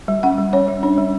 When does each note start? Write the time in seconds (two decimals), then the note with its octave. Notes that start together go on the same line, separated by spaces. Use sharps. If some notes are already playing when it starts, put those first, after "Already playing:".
0.08 G3
0.23 C#4 F#5
0.38 G3
0.53 C#4 C#5
0.68 G3
0.83 C#4 D4
0.98 G3